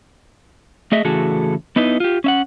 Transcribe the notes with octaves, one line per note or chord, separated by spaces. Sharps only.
A3 G#4 D#5 E5
A2 C#3 E3 F#4 G#4 A4
B3 D#4 E4 B4 D#5
F4 G4
C#4 E5 F#5